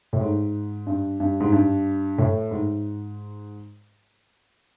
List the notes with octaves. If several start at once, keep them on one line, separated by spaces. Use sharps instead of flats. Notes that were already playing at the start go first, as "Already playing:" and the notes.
A2
G#2
G2
G2
G#2
G2
A2
G#2